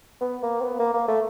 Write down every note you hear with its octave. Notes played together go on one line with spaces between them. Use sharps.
B3
A#3
C4
B3
A#3
A#3
A3